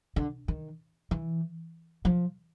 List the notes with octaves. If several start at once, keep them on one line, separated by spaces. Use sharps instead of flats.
D3
D#3
E3
F3